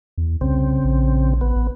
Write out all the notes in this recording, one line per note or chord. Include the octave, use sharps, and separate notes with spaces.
E2
C2 C#3 C4
A#1
A1 B3
A1